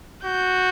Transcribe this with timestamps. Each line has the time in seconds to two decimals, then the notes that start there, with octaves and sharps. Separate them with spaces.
0.25 F#4 G6